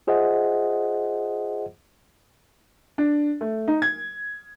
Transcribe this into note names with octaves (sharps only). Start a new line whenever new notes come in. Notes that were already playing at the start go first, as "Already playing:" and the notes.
F4 G#4 C5 D#5 E5 F#5
D4
A3
D#4
G#6